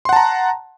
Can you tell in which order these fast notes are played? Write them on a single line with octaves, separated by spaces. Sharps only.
C6 F#5 A5 A#5